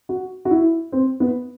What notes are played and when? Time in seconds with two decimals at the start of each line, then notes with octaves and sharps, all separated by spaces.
0.09 F#4
0.45 F#4
0.51 E4
0.92 C4
1.20 B3